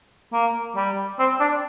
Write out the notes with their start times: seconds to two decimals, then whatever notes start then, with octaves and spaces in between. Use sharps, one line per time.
0.33 A#3
0.76 G3
1.19 C4
1.40 D4